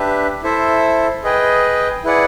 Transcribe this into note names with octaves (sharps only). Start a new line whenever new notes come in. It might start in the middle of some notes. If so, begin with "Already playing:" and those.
Already playing: D4 G4 B4 E5
E4 A4 C5 E5
G#4 B4 D#5 G5
E4 G#4 B4 D5 F#5